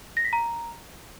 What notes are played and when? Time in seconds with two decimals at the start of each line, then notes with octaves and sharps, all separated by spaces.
0.17 A#6
0.25 B6
0.33 A#5